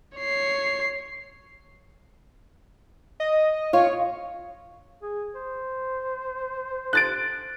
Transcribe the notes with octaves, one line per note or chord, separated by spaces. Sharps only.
C#5 C7
D#5
F4 C#5
G#4
C5
F#6 A6 D7